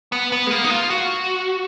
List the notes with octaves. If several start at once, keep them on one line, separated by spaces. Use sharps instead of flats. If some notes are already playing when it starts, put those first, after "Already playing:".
B3
B3
G#3
A#3
D#4
F4
F#4